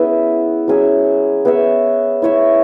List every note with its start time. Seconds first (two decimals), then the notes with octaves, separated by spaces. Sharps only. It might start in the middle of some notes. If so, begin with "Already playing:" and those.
Already playing: B3 C#4 E4 G#4 E5
0.68 F#3 C#4 G#4 E5
1.45 B3 G#4 C#5 E5
2.22 E4 C#5 E5